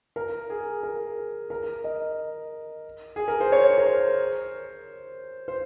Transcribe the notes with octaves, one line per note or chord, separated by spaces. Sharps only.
A#4
G#4
A#4
A#4
D#5
G#4
A#4
C5
C#5
A#4
C5
C5